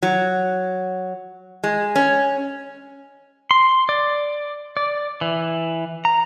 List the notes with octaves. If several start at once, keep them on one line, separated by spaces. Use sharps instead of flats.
F#3
G#3
C#4
C6
D5
D5
E3
A#5